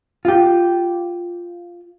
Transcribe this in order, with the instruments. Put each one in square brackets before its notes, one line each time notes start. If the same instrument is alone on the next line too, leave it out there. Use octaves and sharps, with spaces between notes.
[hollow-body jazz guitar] F4 G4